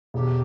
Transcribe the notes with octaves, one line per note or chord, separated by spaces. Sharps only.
E1 G4